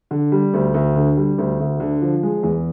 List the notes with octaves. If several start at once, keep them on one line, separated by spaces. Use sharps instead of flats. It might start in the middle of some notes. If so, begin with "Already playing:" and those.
D3
G3
D2
D2
D3
G3
D2
D2
D3
F3
G#3
E2